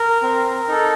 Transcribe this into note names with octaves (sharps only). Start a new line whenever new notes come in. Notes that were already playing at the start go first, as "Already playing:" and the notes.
Already playing: A#4
C4
D#4 A4